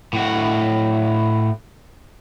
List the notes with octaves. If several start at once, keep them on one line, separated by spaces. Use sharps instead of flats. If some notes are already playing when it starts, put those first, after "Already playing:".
A2 F#4